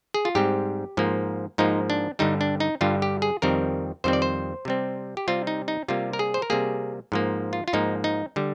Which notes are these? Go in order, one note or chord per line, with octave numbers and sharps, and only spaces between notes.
G#4
F4
G#2 G3 C4 G4
G#2 F3 A#3
G#2 F3 A#3 D#4
D4
G2 D3 G3 D#4
D4
D#4
G2 D3 G3 F4
G4
G#4
F2 D#3 G3 C4 A#4
F2 D#3 G3 C4 C5
D5
C5
C3 G3 C4
G4
C3 G3 C4 F4
D#4
D#4
C3 G3 A#3 F4
A#4
G#4
C5
A#4
C3 G3 A#3 G#4
G#2 F3 A#3
F4
F4
G#2 F3 A#3 D#4
D#4
D3 G3